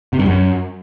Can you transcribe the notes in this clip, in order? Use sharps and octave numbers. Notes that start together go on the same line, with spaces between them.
C3
G2
F#2